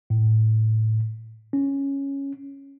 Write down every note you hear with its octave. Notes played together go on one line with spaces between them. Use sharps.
A2
C#4